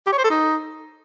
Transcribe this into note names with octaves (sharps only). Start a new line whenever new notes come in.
G4
C#5
C5
A4
D#4